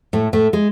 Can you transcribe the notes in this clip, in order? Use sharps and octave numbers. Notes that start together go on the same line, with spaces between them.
A2 A3
A2 A3
G#3